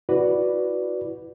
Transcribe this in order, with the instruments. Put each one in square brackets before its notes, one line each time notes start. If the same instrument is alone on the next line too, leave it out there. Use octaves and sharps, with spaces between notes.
[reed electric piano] E4 F#4 B4 D5